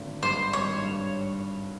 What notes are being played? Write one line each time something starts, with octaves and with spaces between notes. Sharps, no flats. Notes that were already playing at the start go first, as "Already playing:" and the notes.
Already playing: G#1 D3
G2 C5
G#1 C#5
G2